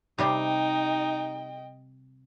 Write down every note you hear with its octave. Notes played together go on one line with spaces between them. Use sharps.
C3 G3 C4 D#4 D#5 G5